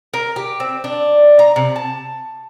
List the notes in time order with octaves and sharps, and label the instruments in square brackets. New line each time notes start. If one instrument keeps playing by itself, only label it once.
[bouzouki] A#4
G4
C4
D4
A#5
C3
A5